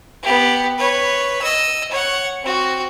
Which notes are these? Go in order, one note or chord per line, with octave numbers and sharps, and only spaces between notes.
B3 G4
B4 C#5
D#5 E6
C#5 F#5
C4 F#4